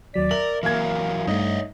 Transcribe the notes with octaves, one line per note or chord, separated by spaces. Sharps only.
D#2 F#3 D5 B6
A#4 E5 F#7
E3 F#3 A#3 A#4 F5 G#6
G2 A3 D#4 C#5 D#5 E5